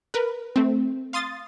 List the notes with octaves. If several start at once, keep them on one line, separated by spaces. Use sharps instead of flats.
A#4 B4
A3 C4
F5 C6 D#6 A6